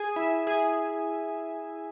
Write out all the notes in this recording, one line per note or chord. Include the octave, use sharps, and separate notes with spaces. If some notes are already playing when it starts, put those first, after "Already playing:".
Already playing: G#4 G#5
E4 E5
G#4 G#5